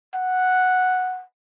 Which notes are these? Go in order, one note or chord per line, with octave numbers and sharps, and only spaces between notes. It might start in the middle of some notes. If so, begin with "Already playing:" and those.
F#5